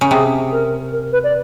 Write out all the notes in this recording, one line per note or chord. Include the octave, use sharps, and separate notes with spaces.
C#3
C3 G#4
A#4
A#4
B4
D5